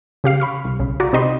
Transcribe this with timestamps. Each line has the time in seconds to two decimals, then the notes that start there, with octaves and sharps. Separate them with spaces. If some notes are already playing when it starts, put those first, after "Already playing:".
0.24 C#3 G4 F5 C7
0.40 B5 C#6 F6
0.65 C2
0.79 B1 C#3
1.00 F4 F#4 D5 A#5
1.13 C3 D#4 G4 D#5 B5 C6